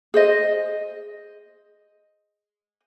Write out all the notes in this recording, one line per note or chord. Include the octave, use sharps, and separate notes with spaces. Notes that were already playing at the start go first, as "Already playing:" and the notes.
G#4 C5 D#5